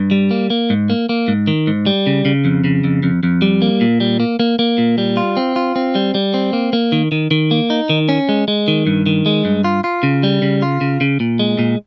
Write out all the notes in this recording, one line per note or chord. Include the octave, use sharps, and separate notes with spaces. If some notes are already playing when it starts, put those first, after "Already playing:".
Already playing: G2
G3
A#3
A#3
G#2
A#3
A#3
G#2
D#3
G#2
G3
C#3
C#3
F2
C#3
F2
F2
F2
G3
A#3
A#2
G3
A#3
A#3
A#3
A#2
G3
F4
C4
F4
C4
G3
G3
C4
A#3
A#3
D#3
D#3
D#3
A#3
D#4
D#3
C#4
G#3
G#3
D#3
G2
D#3
G#3
G2
F4
F4
C#3
G3
C#3
F4
C#3
C#3
A#2
G#3
A#2